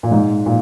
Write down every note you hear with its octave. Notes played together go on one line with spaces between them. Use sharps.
A#2
G#2
A#2